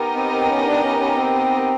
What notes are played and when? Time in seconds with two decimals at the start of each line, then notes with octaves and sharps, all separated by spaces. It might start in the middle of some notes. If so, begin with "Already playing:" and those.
Already playing: B3 D#4 G4 A#4 D#5
0.15 C4
0.32 C4
0.49 C#4
0.66 D4
0.82 C#4
0.99 C#4
1.16 C4